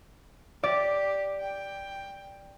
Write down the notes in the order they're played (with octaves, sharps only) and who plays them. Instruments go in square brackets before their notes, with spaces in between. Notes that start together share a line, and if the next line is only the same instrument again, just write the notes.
[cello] G4 [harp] D5
[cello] G5